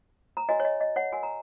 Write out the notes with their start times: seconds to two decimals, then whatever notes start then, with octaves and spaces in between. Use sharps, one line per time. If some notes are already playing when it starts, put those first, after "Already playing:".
0.37 A#5
0.49 F#4 A#4 C#5 D#5 G#5
0.60 C#5
0.65 D#5
0.80 D#5
0.96 C#5 F#5
1.12 F#4 A#4 C#5 G#5
1.23 A#5